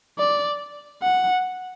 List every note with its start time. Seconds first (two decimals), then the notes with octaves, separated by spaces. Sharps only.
0.19 D5
1.03 F#5